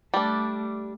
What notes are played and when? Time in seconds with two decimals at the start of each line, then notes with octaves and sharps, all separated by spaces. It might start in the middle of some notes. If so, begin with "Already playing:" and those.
0.14 G3 A3 D4